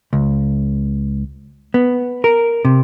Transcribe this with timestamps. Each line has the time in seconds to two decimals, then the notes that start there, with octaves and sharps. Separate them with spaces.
0.13 C#2
1.74 B3
2.24 A#4
2.65 C3